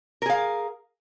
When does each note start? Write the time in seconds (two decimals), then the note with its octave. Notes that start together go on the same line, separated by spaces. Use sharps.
0.22 A#4
0.26 G#4
0.30 F5